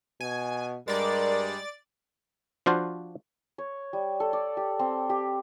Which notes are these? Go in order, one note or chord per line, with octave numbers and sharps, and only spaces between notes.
B2 G#5
G2 G3 G#3 A#4 D5 A6
F3 D4 F4 F#4 C5
C#5
G3
A4
D5
G4
C4
G4